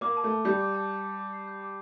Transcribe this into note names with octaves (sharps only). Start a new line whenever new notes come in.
A#3 D6
A5
A3
A5
G3 G6
D6
A5
G6
D6
D6
C7
G6
D6